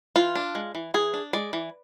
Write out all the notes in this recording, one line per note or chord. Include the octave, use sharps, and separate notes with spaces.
E3 F4
D4
G#3
E3
E3 G#4
D4
G#3 D5
E3